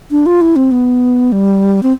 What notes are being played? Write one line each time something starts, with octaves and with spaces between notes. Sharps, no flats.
D4
F4
E4
C4
B3
G3
C4